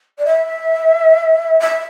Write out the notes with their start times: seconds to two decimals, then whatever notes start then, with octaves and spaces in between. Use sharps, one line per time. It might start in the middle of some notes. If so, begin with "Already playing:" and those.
0.18 D5
0.25 E5
1.60 E5